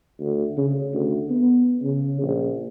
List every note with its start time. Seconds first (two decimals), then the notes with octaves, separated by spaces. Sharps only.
0.20 D2
0.57 C#3
0.94 D2
1.29 B3
1.82 C#3
2.22 A#1